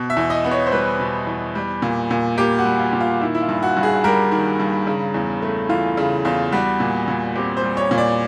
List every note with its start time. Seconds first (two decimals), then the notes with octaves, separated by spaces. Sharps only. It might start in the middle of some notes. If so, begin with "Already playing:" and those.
Already playing: B2
0.10 E5
0.17 E2
0.30 D#5
0.44 B3
0.51 C#5
0.66 C5
0.72 G3 B4
1.00 B2
1.27 E2
1.55 G3
1.82 A#2
2.11 A#2
2.38 A#3 G4
2.59 F#4
2.65 G3
2.79 F4
2.93 A#2
3.00 F4
3.21 D#3 E4
3.35 E4
3.42 F4
3.48 G2
3.63 F#4
3.76 G2
3.83 G#4
4.04 G3 A#4
4.32 D#3
4.60 G2
4.87 C#3
5.14 E2
5.42 A3
5.69 E3 F4
5.97 C#3
6.25 E2 F4
6.52 G3 F#4
6.80 A#2
7.08 A#2
7.35 C4 G4
7.57 C5
7.64 G3
7.77 C#5
7.91 A#2
7.98 D5